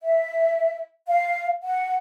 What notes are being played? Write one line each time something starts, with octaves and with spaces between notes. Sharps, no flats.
E5
F5
F#5